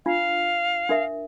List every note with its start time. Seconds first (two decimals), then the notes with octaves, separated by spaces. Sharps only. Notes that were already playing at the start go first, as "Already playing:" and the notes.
0.06 D4 F4 F5
0.89 D4 A#4 E5